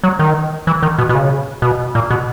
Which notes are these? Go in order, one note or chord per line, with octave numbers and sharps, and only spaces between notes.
F#3
D#3
E3
D#3
B2
B2
C#3
B2
A#2
B2